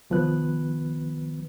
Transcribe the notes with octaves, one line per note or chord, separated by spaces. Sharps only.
C2 D#3 F3 B3 B4 F#6